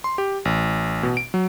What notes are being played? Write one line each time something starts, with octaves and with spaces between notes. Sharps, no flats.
C6
G4
A1
B2
D7
F#3